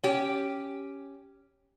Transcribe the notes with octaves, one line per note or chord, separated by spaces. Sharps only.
C#4 G4